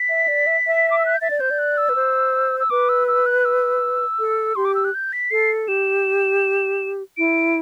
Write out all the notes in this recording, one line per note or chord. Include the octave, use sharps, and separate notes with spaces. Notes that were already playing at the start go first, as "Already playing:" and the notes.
Already playing: B6
E5
D5
E5
E5
D6
E6
F#6
G6
E5 A6
D5
C5 G6
D5
F#6
E6
B4
C5
E6
B4 D6
E6
E6
F#6
E6
A4
G4 C6
D6
E6
F#6
G6
B6
A4 C7
G4 E7
E4 D7